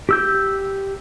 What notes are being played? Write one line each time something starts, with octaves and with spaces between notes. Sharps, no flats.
G4 E6 G6